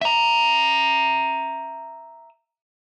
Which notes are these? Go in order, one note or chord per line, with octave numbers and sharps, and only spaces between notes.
E5 A#5